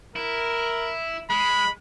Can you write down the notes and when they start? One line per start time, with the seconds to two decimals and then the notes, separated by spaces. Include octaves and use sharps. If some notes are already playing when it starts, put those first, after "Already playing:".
0.16 E4 A#4
1.30 G#3 B5